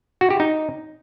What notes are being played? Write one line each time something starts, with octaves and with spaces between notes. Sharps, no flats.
F#4
G4
D#4